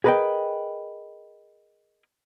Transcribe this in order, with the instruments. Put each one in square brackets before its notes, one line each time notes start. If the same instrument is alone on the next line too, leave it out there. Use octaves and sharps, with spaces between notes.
[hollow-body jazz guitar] G#4 A#4 B4 D5 D#5 G5